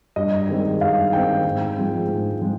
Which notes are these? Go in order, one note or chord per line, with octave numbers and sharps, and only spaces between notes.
G2 D#5
D#3 G#3 C4
G2 F5
D#3 G#3 C4 G5
G#2
F3 G#3 C4
G#2
F3 G#3 C4